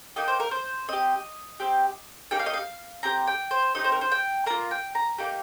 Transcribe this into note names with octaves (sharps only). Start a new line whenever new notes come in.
A#3 D#4 G4 D#5
C5
A#4
C5
C4 G4 D#5
C4 G4
A#3 D#4 G4 G5
F5
D#5
F5
C4 G4 A#5
G5
C5
C4 D#4 G4 D#5
C5
A#4
C5
G5
A#3 F4 A#5
G5
A#5
A#3 D#4 G4